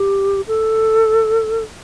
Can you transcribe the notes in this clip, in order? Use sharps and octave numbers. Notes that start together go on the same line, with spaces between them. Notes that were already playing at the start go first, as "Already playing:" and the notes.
Already playing: G4
A4